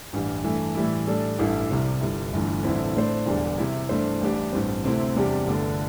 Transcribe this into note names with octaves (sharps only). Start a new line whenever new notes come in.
A1 G2 E3 G3
G2 E3 A3
A2 E3 G3 E4
A2 G3 D4 A4
A1 G2 G3 E4 A4
C2 C3 G3
G1 G2 G3
G1 G2 E3 A3
A1 G2 D3 C4 E4
A2 A3 D4 A4 C5
E1 E2 D3 G3 D4
C3 G3 E4
G2 E3 A3 D4 C5
A1 A2 G3 D4 G4
A1 G2 G3 C4
D2 C3 A3 C4 E4
E2 C3 G3 D4 G4
G1 G2 D3 A3 D4